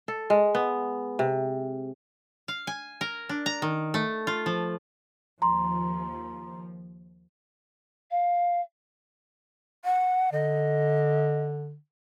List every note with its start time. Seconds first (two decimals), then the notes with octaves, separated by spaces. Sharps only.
0.08 A4
0.30 G#3
0.55 B3
1.19 C3
2.48 F5
2.67 G#5
3.01 A#4
3.29 D4
3.46 A#5
3.62 D#3
3.94 A3
4.27 F4
4.46 F3
5.42 D#2 F3 A#5 C6
8.11 F5
9.85 F#5
10.32 D3 D#5